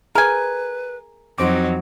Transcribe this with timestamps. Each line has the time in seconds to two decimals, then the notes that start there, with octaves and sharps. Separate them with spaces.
0.15 G#4 A#4 B4 G#5
1.38 F2 F#3 C4 D#4 F#4 C5 D6